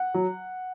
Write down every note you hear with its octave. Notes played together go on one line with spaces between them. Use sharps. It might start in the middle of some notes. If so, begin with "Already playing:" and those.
Already playing: F#5
F#3